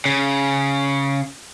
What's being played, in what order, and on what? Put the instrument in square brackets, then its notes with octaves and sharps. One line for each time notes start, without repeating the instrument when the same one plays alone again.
[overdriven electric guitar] C#3